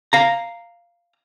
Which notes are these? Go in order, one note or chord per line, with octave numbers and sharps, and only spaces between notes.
F5 A#5